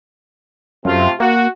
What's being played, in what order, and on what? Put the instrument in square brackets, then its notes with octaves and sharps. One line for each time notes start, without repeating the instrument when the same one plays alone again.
[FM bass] F#2 [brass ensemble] C3 A3 F4
[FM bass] A#3 [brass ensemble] F#4